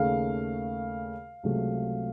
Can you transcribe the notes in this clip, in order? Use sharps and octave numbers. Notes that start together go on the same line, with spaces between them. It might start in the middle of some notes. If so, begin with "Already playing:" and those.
Already playing: D#2 C#3 A3 F5
C#2 C3 F#3 A3